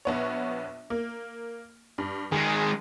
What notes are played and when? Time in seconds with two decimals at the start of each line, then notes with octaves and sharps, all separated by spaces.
0.05 A#1 B3 C#5
0.90 A#3
1.98 G2
2.32 D#3 G#3 G#4